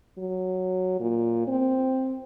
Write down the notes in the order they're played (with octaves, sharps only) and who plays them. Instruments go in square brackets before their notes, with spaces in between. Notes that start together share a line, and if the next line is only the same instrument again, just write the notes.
[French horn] F#3
A#2
C4